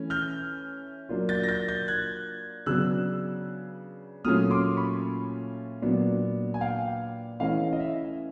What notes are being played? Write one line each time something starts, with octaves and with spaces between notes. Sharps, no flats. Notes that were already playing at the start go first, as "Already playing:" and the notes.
Already playing: E3 A3 C#4
F6 G6
F#3 A#3 D4 F4
G6 A6
A#6
G6 A6
G6 A6
F#6 G#6
C#3 F#3 B3 D4 E6 F#6
A#2 F#3 A3 C#4 F4 D#6 F6
C6 D6
B5 C#6
A#2 F#3 B3 D4
G#5
F5 G5
E3 A3 C#4 E4 D#5 F5
D#5
E5